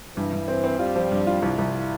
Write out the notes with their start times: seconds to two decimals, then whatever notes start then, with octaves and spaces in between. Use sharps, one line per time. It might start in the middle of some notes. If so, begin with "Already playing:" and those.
0.16 G2 E3
0.32 G2
0.48 C4
0.64 C4
0.79 G3 F4
0.96 F3
1.12 G2
1.27 F4
1.42 C2 E4
1.58 C2